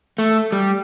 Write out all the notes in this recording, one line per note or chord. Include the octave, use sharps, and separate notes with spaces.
A3
G3